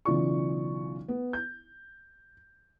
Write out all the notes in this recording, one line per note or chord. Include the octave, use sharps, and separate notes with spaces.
B1 C#3 E3 F4 D5 C#6
B3
G6